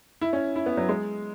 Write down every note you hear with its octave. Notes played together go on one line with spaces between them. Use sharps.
E4
C#4
E4
B3
F#3
G#3